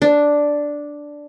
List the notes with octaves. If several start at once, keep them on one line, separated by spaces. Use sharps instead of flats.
D4